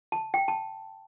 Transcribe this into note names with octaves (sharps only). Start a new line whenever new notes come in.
A5
G5
A5